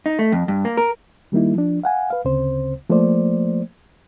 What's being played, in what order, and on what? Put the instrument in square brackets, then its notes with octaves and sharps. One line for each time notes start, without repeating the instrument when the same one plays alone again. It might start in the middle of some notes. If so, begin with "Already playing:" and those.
[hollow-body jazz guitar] D#4
A3
F2
G2
A#3
A#4
[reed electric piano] D#3 G3 A#3 D#4 E4
F3 D4
F5 F#5 G#5
B4 F5
D2 C#3 C4 C5
F3 A3 A#3 C5 D5